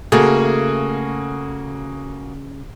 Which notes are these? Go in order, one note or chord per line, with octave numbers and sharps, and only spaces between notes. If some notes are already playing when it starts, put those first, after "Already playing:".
C#3 A3 A#3 F#4 G#4